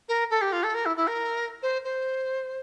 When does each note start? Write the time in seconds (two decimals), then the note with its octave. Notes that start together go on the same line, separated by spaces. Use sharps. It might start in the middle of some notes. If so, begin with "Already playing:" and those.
0.08 A#4
0.30 A4
0.41 G4
0.52 F4
0.63 A4
0.74 A#4
0.85 E4
0.96 E4
1.07 A#4
1.62 C5
1.84 C5